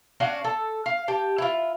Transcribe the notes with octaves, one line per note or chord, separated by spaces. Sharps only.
C#4 D4 F#4 F5
A4
F5
G4 A5
E4 F4